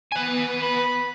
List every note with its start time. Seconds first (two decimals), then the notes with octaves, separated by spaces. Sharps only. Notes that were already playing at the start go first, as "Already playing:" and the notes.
0.12 B3 B4 G#5
0.62 B5